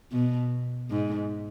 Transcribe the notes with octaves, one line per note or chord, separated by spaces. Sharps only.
B2
G#2